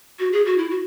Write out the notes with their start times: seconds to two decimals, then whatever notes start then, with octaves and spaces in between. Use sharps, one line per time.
0.19 F#4
0.33 G#4
0.46 F#4
0.58 E4
0.71 F#4